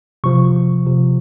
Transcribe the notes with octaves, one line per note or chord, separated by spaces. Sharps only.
C3 F3 C#6
C3 F3